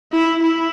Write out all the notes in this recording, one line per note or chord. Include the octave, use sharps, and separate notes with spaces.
E4
E4